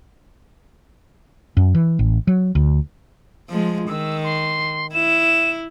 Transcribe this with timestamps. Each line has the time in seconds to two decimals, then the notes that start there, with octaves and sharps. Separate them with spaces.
1.57 F#2
1.75 E3
1.99 A1
2.27 F#3
2.55 D2
3.49 F3 G#3
3.89 D#3 E6
4.24 C6
4.93 E4 E7